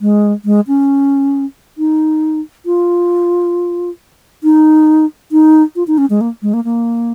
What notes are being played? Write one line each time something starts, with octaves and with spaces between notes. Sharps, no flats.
G#3
G#3
C#4
D#4
F4
D#4
D#4
F4
D#4
C#4
G#3
A#3
G#3
A#3
A#3